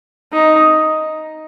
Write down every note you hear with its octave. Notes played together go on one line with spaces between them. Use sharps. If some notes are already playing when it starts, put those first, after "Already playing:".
D#4